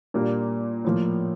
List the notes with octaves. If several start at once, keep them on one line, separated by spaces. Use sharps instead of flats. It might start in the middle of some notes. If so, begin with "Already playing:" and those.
A#2 G3 A#3 D4
A2 F3 A#3